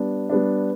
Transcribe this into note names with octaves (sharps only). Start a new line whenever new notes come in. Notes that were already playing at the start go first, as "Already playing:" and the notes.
Already playing: G3 B3 D4
G3 B3 D4